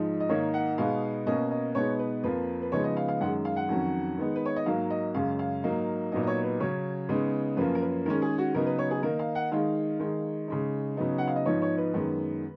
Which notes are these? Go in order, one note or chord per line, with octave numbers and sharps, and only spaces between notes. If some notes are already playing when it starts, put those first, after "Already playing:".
Already playing: G#2 F3 G#3 D#4
D#5
G#2 D#3 A#3 D#4 C#5
F#5
B2 G#3 B3 D#4 F5
B2 A#3 C#4 D#5
D#5
B2 G#3 B3 D#4 C#5
B4
F2 F3 A#3 B4
B4
C#3 F3 G#3 B3 D#4 C#5
D#5
F5
F5
F#2 D#3 G#3 F#5
F5
F#5
F2 D#3 F#3 C#4
D#3 G#3 B3 D#4
B4
C#5
D#5
G#2 F#3 A#3 F5
D#5
F#2 C#3 G#3 C#4 F5
F5
G#2 F#3 A#3 D#4
A#2 F#3 B3 D#4 D#5
D#5
C#5
B4
C#3 F#3 C#4 C#5
C#3 G#3 B3 D#4
F#2 F3 A#3 C#4 B4
A#4
B4
D#3 G#3 C#4 A#4
G#4
F#4
C#3 F#3 B3 D#4 A#4
B4
C#5
G#4
D#3 A#3 D#4 A#4
F5
F#5
D#3 G#3 D#4 F5
D#3 G#3 D#4
C#3 G#3 D#4
C#3 F#3 B3 D#4
F#5
F5
D#5
G#2 F3 B3 D#4 C#5
C#5
B4
F#2 D#3 G#3 B3